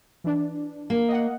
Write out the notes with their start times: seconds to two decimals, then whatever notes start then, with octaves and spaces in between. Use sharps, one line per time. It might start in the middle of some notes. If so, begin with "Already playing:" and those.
0.24 E3 D4
0.90 A#3
1.09 D#5 F#5